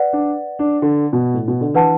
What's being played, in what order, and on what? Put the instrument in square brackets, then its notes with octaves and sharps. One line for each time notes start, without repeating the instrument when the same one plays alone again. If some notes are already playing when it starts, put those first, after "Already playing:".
Already playing: [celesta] B4 D5 F#5
[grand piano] D4
D4
D3
B2
A2
B2
D3
[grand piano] E3 [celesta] D4 B4 F#5 A5